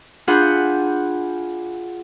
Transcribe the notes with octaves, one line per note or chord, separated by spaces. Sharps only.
D4 F4 G#4 F#5 B5 G6